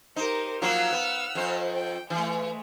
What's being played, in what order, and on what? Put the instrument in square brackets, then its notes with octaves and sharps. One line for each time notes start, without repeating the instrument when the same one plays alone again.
[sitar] D#4 [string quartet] G4 A#4 C5
[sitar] F3 F#3 A#3 [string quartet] F#5 E6 F6
[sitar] B3
F2 C5
[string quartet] G5
[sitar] E3 [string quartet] G#3 A3